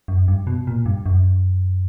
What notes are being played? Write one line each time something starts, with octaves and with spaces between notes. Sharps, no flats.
F#2
G2
B2
A#2
G2
F#2